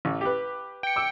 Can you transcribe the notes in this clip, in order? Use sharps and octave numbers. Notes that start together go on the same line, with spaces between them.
A1
G4 B4
G5 C#7
D6 E6